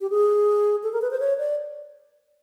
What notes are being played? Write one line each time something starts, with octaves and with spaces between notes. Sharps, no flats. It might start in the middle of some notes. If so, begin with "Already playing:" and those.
G4
G#4
A4
A#4
B4
C5
C#5
D5